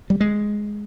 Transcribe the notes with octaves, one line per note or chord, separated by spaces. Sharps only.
G3
G#3